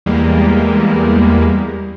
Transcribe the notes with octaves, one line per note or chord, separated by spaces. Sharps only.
E2 G3 G#3 A#3